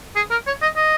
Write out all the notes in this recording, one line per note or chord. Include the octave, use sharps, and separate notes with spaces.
G#4
A#4
C#5
D#5
D#5